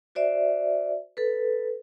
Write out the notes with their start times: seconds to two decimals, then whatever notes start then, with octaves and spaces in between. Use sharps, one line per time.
0.15 F#4 C5 D5 E5
1.17 A4 B4